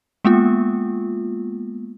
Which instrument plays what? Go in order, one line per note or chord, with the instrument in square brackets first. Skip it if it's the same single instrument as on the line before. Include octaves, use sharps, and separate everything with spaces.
[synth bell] G#3 A#3 B3 F4